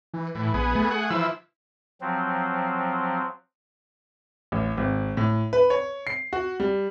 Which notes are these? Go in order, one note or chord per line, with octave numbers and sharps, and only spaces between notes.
E3
A2 E3
A#1 B3 G#4
A3
G#4 F#5
E3 F3 E4 E6
F3 F#3 C4
A1
G#1
A2
B4
C#5
C7
F#4
G3